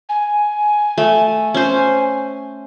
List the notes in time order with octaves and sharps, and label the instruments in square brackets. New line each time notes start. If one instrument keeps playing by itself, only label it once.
[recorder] G#5
[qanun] A3
C#4 C5